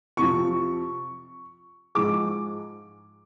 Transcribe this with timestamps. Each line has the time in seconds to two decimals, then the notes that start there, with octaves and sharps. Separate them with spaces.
0.17 F2 C3 F3 C#6
1.95 G#2 F3 G#3 D6